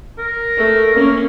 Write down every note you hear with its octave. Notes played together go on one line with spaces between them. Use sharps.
A#4
A3
A#3 C#4